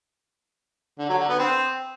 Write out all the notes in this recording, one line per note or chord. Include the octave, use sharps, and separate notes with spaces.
D3
F#3
D3
B3
C4